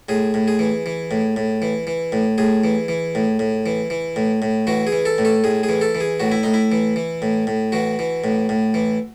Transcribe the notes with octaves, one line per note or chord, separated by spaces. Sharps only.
A2 G#4
A2
G#4
E3
E3
A2
A2
E3
E3
A2
A2 G#4
E3
E3
A2
A2
E3
E3
A2
A2
E3 F#4
G#4
E3
A4
A2
A4
A2 G#4
G#4
E3
A4
E3
G#4
A2 F#4
E4
A2 D#4
E4
E3
E3
A2
A2
E3 F#4
E3
A2
A2
E3